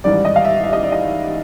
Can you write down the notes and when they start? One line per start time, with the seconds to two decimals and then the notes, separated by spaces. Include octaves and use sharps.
0.04 A1 G#2 D#3 G3 D5
0.25 D#5
0.36 F5
0.44 E5
0.64 E5
0.73 D#5
0.83 D5
0.92 D#5